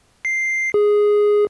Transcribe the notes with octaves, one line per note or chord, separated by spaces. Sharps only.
C7
G#4